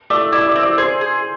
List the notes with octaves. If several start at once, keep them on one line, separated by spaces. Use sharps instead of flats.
A3 D5 D6
E4 D5 D6
E6
D5 D6
C4
D5 D6
G#4 C5 C6
G#4